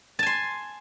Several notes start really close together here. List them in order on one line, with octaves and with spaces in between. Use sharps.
A5 G#5 C6